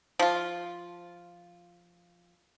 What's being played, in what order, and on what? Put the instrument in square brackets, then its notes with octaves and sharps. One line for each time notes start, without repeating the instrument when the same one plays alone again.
[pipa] F3 F4